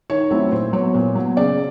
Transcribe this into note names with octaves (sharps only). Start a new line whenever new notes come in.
D#3 C#5
F#3 A3 C4 E4
A#2 C5
F#3 B3 C#5
A#2
F#3 B3
C#3 D5